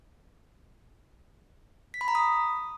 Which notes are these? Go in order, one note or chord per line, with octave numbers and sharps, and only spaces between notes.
B6
B5
A#5
D#6